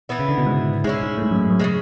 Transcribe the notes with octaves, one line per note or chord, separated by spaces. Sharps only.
E3 B3 E4
C#3
D3
B2
G#2
G#2 G#3 C#4 E4
G#2
A2
G#2
F#2
F#2
C#3 E3 G#3